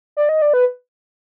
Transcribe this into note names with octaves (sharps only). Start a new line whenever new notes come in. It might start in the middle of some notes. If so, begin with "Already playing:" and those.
D5
D#5
D5
B4